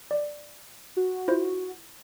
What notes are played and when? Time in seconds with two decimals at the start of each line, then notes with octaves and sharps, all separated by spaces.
0.11 D5
0.97 F#4
1.28 E4 F4 C5